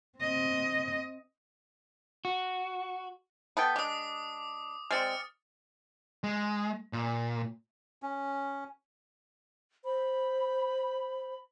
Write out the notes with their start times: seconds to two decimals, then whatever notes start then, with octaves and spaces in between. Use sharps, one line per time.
0.19 C4 D#5
2.25 F#4
3.57 B3 A4 G5
3.76 G#3 D4 D6 D#6
4.91 G#3 C4 D5 F6 A6 C#7
6.24 G#3
6.93 A#2
8.03 C#4
9.85 C5 B5